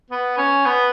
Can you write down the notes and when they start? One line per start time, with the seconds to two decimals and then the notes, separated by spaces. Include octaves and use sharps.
0.10 B3
0.37 C#4
0.65 B3